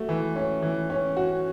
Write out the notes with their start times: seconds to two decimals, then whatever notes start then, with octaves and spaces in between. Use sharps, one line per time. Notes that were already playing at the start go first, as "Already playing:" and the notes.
Already playing: A3 F#4
0.09 E3
0.36 C#4
0.62 E3
0.90 C#4
1.17 F#4